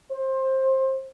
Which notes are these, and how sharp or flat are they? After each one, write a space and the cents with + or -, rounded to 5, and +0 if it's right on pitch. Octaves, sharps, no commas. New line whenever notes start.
C5 +20